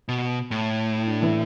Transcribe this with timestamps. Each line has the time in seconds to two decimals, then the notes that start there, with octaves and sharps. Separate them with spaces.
0.09 B2
0.51 A2
0.95 E4
1.08 D4
1.22 E3 E4